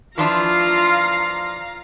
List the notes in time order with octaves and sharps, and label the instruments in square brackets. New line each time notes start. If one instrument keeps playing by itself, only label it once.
[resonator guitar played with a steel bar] E3 F3 D4 [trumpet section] F4 [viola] F5 A#5